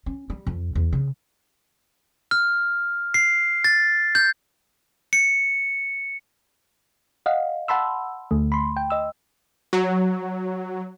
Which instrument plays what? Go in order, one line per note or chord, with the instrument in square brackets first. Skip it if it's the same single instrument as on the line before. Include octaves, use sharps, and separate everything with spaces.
[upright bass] C#4
G3
F2
E2
C#3
[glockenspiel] F6
C7
A6
G6
C#7
[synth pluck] D#5 F5 F#5
F#5 A5 B5 C6 E6
D2 D3 A3
B5 C6
G5
D#5 E6
[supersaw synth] F#3